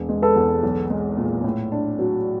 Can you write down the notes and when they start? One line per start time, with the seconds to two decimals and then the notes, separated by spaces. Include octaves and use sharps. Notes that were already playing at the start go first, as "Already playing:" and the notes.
Already playing: E1
0.09 G#3
0.22 A4 B4
0.36 E2
0.63 B1
0.90 G#3
1.17 A#2
1.44 A2
1.72 D4
1.99 F#3